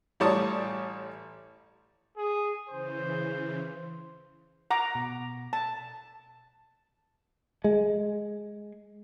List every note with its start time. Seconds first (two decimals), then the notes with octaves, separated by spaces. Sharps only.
0.20 A1 G3 C#5 D5 A5 D#6
2.17 G#4
2.69 C#3 E3 C5
4.71 F#5 A#5 D6
4.95 B2
5.53 A5
7.64 G#3